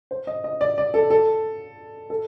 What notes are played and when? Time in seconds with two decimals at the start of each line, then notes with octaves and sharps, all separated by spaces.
0.11 C5
0.27 D#5
0.44 D#5
0.61 D5
0.78 D5
0.94 A4
1.10 A4
2.10 A4